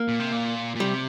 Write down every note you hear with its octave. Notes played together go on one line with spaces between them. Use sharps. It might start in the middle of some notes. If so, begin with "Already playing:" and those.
Already playing: A#3
A#2
C3
A#2
A#2
C3 G3